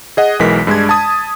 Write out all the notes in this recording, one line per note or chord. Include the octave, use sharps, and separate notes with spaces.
G#4 D#5 F#5
B1 E3 G#3 A#4 B6
G2 G#3 D4 G#6
A5 D#6